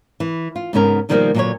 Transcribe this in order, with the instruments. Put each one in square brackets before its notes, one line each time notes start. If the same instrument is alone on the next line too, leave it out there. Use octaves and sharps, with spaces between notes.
[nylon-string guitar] E3
F4
G#2 C#3 B3 C#4 A#4
B2 D#3 F3 G3 G#3 A#3
A#2 D3 F#3 F#4 B4 C#5